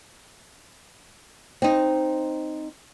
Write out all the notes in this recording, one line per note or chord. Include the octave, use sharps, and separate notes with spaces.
C4 D#4